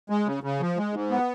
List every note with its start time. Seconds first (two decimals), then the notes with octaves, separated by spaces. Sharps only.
0.10 G#3
0.27 C#3
0.43 C#3
0.60 F3
0.77 G#3
0.94 G#2
1.11 B3